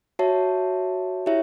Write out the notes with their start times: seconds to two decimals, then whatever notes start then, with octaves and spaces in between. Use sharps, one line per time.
0.19 F#4 C#5 E5 A5
1.26 E4 G4 C#5 E5